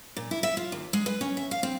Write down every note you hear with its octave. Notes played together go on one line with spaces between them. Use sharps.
A#2
E4
E5
F4
D#2
G#3
B4
C#4
E5
F5
C4